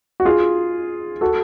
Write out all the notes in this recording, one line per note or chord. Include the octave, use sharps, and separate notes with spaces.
F#4
F4 G#4
F#4 A4